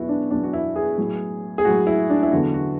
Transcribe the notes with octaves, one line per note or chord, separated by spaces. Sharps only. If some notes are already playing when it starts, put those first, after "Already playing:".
Already playing: E2 B2 F#3 E4 F#4
D4
E2 B2 F#3 D4
F#4
E4
G#4
A2 F#3
G#4
A2 F#3 F#4
E4
D4
E4
E2 D3 F#3 F#4
F#4